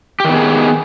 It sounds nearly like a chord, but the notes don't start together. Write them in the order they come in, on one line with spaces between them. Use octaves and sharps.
G4 D#3 B3 G#4